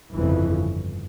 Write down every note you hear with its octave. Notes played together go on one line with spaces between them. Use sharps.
G1 F2 C#3 E3